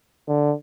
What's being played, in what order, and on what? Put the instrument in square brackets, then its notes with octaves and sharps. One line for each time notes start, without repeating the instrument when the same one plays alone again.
[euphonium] D3